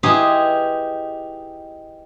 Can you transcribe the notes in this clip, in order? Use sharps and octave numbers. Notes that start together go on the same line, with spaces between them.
D#4 E4 G4 G#4 B4 C5